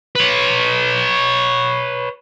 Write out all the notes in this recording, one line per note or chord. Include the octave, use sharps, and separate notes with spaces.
B4 C#5